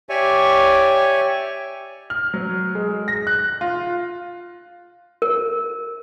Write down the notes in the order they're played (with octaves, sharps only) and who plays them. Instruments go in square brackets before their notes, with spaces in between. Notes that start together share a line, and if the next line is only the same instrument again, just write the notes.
[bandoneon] G4 C#5 D5 E5 G#5 C#6
[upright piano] F6
F#3
G#3
A#6
F#6
F4
[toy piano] A#4